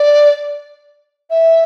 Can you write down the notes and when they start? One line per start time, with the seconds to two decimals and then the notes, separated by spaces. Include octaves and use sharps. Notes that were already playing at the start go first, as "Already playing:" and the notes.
Already playing: D5
1.30 E5